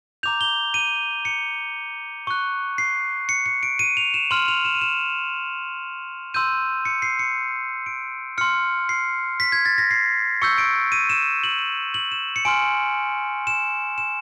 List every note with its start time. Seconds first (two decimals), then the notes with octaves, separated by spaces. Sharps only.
0.23 A#5 D6 G6 F7
0.41 G7
0.74 D#7
1.25 C#7
2.27 C#6 F#6
2.78 C7
3.29 C#7
3.46 C#7
3.63 D7
3.79 D#7
3.97 F7
4.14 E7
4.31 C6 F6 F#7
4.48 F7
4.65 E7
4.75 D#7
4.81 E7
6.34 C6 E6 G6 D#7
6.85 C#7
7.02 C7
7.19 C#7
7.86 D7
8.38 C6 F6 C#7
8.89 C7
9.40 B6
9.52 G#6
9.65 A6
9.78 A#6
9.91 C7
10.42 C#6 E6 G6 C#7
10.58 D7
10.92 D#7
11.10 E7
11.44 F#7
11.94 F#7
12.12 E7
12.36 C#7
12.45 G#5 C6 F6 D7
13.47 E7
13.98 E7